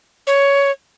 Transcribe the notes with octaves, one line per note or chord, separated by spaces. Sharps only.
C#5